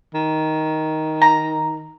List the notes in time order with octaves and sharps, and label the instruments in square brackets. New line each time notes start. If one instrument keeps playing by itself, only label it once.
[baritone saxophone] D#3
[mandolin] A#5